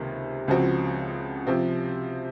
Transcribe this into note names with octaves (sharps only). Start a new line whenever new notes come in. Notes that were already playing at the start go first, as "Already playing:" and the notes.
Already playing: C#2 C3 D#3 A#3
C#2 C#3 F3 C4 F#4
C3 F3 C4